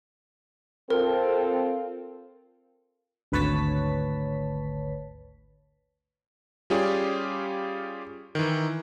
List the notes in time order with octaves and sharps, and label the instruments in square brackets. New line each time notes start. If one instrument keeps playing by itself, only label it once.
[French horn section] C4 F4 A4 [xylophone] A#4
[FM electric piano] G#1 D2 B4 C#5 A5 B6
[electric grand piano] G3 C#4 F4 G4 G#4 D5
D#3 E3